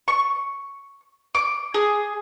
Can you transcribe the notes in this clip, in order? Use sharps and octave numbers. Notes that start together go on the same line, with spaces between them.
C#6
D6
G#4